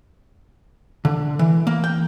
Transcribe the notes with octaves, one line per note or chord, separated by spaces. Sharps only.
D3
E3
A#3
G5